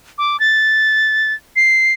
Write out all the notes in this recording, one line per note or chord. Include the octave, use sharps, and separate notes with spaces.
D6
A6
C7